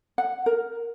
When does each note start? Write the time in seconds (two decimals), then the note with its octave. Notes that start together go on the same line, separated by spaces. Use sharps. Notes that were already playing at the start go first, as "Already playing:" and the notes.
0.18 F#5
0.46 A#4